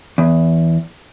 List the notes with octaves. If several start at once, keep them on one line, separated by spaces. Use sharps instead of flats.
E2